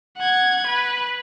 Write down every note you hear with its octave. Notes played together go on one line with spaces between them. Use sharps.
F#5 G#6
B4